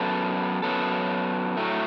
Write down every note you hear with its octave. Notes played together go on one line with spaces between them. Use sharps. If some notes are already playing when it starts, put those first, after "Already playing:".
Already playing: F#2 F#3 B3 A4
F#2 F#3 B3 A4
A2 F#3 A3